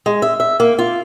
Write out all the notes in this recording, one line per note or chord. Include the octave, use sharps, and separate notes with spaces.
G#3
E5
E5
A#3
F4